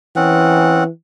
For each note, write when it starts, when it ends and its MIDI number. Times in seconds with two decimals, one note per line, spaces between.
0.16 0.89 52
0.16 0.84 60
0.16 0.84 61
0.16 0.84 78